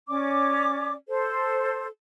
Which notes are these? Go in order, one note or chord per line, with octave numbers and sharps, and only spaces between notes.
C#4 D5 D6
A4 C5